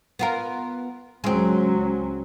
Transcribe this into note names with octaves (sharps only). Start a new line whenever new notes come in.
B3 F4 A#4
C#2 F#3 G#3 C4 C#4